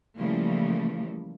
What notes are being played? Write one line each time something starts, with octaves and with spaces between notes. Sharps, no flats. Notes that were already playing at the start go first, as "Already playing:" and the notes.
C#3 E3 F3 G3 A3 A#3